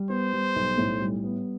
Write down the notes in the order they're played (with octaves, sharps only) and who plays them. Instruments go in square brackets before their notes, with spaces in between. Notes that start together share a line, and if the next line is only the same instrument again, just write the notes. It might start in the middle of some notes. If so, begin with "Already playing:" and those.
Already playing: [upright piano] G3
[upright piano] B3 [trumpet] C5
[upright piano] G3
B1
A2
G3
B3